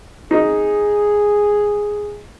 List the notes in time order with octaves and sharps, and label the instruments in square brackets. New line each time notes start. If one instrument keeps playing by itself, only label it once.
[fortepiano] D#4 [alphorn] G#4